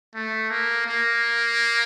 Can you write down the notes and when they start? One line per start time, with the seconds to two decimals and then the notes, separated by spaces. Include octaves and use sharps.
0.15 A3
0.50 A#3
0.86 A#3